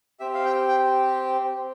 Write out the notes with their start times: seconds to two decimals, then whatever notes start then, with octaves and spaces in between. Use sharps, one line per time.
0.20 C4 G4 E5
0.34 F5
0.45 G5
0.69 G5